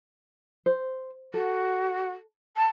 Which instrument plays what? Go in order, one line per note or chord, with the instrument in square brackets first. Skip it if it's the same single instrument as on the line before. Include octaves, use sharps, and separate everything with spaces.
[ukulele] C5
[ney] F#4 [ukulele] A4
[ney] A5